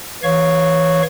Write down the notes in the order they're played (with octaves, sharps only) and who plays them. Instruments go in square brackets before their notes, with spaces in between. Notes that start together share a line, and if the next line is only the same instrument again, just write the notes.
[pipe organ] E3 C#5 F5 C#6